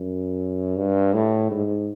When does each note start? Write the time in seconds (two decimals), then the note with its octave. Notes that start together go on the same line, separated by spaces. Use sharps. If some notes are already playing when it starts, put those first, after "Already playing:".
Already playing: F#2
0.76 G2
1.14 A2
1.51 G#2